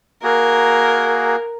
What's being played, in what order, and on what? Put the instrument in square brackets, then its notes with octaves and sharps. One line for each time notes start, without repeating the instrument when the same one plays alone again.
[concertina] A#3 F#4 G#4 [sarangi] A#4